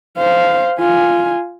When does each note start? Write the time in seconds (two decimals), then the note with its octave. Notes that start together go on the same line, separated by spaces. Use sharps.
0.17 C5 F5
0.80 F4 G#5